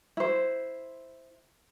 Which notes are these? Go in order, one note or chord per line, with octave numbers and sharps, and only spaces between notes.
E4 C5